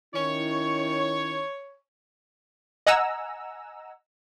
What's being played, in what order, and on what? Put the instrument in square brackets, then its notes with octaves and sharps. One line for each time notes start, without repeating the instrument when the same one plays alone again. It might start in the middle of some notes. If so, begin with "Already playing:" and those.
[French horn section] D#3 C#4 E4 [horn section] C#5
[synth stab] D#5 F#5 G#5 A#5 E6